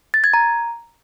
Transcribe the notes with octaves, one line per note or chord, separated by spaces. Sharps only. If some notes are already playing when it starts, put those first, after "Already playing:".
A6
G#6
A#5